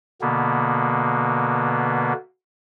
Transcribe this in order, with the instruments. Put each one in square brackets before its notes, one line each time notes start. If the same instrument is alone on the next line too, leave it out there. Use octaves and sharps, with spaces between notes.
[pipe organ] B2 D3 A#3 B3